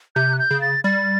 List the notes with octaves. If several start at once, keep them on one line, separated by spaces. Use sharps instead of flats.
C3 G6
F#6
G6
C#3
A6
G3 A6